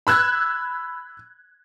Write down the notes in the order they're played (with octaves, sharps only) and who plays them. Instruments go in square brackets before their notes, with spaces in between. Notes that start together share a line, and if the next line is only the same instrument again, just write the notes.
[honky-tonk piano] B5 E6 F#6 G#6